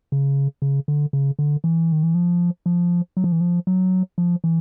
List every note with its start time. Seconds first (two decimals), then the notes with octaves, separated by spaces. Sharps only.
0.12 C#3
0.62 C#3
0.88 D3
1.13 C#3
1.39 D3
1.64 E3
1.92 D#3
2.03 E3
2.15 F3
2.66 F3
3.17 F#3
3.24 F3
3.32 E3
3.41 F3
3.67 F#3
4.18 F3
4.44 E3